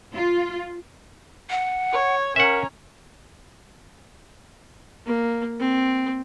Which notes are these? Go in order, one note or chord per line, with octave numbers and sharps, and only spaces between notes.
F4
F#5
C#5
C#4 A#4 E5 F#5 A#5
A#3
C4